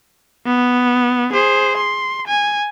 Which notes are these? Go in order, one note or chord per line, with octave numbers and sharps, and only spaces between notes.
B3
G#4 C5
C6
G#5